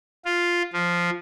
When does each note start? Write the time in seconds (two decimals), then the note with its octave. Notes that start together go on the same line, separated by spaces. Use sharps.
0.25 F4
0.73 F3